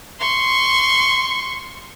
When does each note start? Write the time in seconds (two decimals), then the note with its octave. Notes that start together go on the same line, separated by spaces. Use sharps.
0.20 C6 C#6